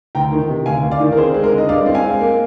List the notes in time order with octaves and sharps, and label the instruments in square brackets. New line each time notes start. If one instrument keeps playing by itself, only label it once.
[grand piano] D2 G5 A#5
D#3
C3
D2 F5 G#5
D2
D5 F5
D#3
A#4
C4 G#4 C5
G#3
A#4
D3
D#5
G2 D5 F5
C4
F5 G#5
G#3
A#3